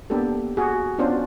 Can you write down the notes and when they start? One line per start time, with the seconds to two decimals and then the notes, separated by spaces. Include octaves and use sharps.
0.10 A#3 B3 D4 G4 A4
0.57 F#4 G#4
0.98 B3 C#4 D4 F4 F#4 C5